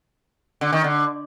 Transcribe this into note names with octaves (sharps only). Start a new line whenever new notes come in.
D3
D#3
D3